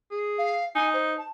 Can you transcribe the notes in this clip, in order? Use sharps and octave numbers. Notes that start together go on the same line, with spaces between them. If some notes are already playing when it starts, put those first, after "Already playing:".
G#4
F5
D#4 G#5
C5
A5